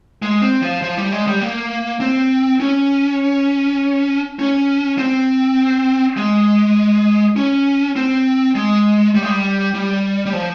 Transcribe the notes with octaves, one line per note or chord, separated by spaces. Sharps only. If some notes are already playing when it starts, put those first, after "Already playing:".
G#3
C4
F3
F3
G3
G#3
G3
A#3
C4
C#4
C#4
C4
G#3
C#4
C4
G#3
G3
G#3
G3
G3
G3
F3